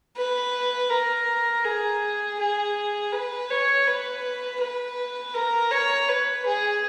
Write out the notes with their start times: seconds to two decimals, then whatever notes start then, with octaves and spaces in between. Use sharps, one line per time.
0.17 B4
0.90 A#4
1.64 G#4
2.39 G#4
3.13 B4
3.50 C#5
3.87 B4
4.61 B4
5.34 A#4
5.71 C#5
6.09 B4
6.46 G#4